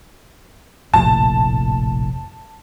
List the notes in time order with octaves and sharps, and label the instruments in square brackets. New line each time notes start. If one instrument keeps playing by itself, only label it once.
[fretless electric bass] F1 A#1 A2 [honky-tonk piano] A5